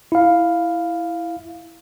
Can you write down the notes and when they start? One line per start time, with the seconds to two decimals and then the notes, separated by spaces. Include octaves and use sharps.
0.12 E4 F5